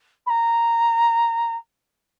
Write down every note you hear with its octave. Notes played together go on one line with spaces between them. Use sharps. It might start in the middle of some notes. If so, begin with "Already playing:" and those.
B5
A#5